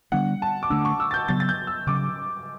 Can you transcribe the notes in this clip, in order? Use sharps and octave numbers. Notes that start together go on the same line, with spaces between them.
D3 G3 B3 D4 F#5
A5
D6
D3 A3 D4 E6
C#6
E6
A6
G6
C#3 F#3 B3 A6
A6
G6
E6
C#3 F#3 C#4 D6